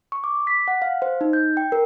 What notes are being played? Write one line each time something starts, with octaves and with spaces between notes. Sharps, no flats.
C#6
D6
B6
F#5
F5
C5
D#4
G6
G5
A#4